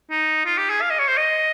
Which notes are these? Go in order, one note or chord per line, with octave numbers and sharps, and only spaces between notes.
D#4
F4
G4
G#4
F5
D#5
C#5
C5
D#5